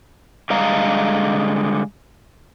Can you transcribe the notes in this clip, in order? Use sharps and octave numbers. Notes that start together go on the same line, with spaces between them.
D3 G3 G#3 D#5 F5 A#5